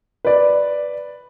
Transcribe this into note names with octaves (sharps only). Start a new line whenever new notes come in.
B4 D5